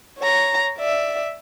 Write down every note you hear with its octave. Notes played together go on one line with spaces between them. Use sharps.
C#5 A#5
D5 E5